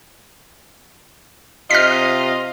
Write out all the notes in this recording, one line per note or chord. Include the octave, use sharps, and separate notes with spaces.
C3 F4 D#5 F6 A#6 B6